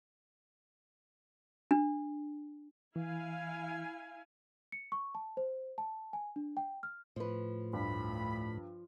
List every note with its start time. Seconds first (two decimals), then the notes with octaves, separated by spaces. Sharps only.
1.71 D4
2.96 E3 E4 F5 G#5
4.72 C#7
4.92 C#6
5.15 A5
5.37 C5
5.78 A5
6.13 G#5
6.36 D4
6.57 G5
6.83 F6
7.16 A2 F3 B4
7.73 D2 G2 B5